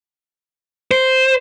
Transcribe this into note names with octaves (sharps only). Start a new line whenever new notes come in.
C5